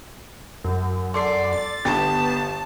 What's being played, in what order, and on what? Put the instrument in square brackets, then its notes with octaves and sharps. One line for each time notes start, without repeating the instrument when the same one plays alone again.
[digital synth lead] F#2
[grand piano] A4 [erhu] D5 [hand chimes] C6 D6 C7
[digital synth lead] A6
[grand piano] G1 G4 A6 [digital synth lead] B3 [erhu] A5